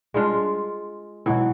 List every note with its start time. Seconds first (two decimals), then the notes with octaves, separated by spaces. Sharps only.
0.14 G3 G#3 D4 F4
1.26 B2 E3 F#3 G#3 B3